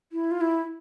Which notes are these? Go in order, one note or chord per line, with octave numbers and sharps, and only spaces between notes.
E4
F4
E4